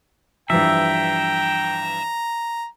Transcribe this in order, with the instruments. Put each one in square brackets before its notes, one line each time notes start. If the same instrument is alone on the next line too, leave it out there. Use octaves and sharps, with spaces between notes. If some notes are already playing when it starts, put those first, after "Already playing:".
[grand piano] G2 E3 F3 [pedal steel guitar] E5 [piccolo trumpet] G5 [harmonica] A#5